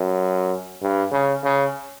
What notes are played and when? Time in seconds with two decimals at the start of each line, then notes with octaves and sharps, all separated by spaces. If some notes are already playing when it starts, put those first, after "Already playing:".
Already playing: F#2
0.82 G2
1.12 C#3
1.43 C#3